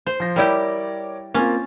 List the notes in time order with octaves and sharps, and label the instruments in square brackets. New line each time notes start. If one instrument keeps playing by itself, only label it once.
[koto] C5
[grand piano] F3 A#6
[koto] G3 E4 G4 [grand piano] A#4 C#5 D5
[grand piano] A#3 C4 F4 [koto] C#4